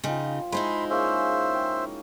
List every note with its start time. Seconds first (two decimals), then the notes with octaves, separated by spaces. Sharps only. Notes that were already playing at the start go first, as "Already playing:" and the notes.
0.04 C#3 F3 D#4 G5 C6
0.52 G#3 D#4 E4 G#4 C5 B5 C6
0.90 A#3 C#4 G#4 C5 E5
1.54 G5